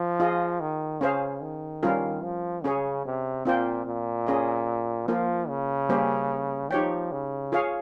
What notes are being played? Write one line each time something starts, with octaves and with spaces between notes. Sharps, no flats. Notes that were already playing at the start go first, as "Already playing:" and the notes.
Already playing: F3
F4 G#4 D#5
D#3
C#3 C#4 G#4 C5 F5
D#3
G3 C#4 F4 A#4
F3
C#3 C#4 G#4 C#5
C3
A#2 C4 F4 C5 G5
A#2
C#4 G#4 D#5
F3 A#3 F4 A#4
C#3
G3 A#3 C#4 G4 C5
F3 D#4 G4 C#5 G5
C#3
F4 G#4 C#5 F5